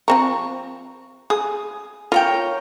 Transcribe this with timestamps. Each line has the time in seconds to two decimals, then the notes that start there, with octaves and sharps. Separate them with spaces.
0.08 F3 C4 A#5 C#6
1.30 G#4 D#6
2.12 F4 A#4 C#5 G5